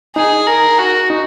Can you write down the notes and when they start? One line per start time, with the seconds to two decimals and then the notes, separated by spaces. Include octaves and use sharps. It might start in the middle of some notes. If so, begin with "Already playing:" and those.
0.16 D#4 G#4
0.47 A#4
0.78 F#4
1.10 D#4